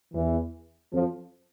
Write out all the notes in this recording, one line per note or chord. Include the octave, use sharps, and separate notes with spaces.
E2 E3
F2 F3